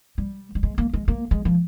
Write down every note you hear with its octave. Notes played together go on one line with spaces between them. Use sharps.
G3
G3
G#3
A#3
G#3
A#3
G#3
F3